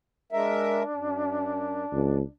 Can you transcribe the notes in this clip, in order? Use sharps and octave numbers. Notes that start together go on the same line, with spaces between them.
G#3 D4 A#4 E5
F#2
C#2